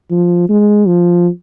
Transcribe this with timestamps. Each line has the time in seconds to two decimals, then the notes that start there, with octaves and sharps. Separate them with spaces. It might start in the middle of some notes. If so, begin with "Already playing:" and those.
0.11 F3
0.49 G#3
0.88 F3